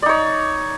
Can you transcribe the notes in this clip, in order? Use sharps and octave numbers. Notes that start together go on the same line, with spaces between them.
D#4 C#5 D5